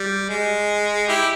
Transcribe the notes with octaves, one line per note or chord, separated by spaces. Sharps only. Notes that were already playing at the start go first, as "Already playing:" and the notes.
Already playing: G3
G#3
E4 G4